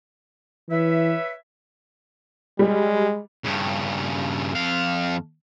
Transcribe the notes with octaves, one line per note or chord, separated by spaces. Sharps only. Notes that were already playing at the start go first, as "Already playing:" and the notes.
E3 B4 C#5 E5
G3 G#3
G2 C#3
F2 F5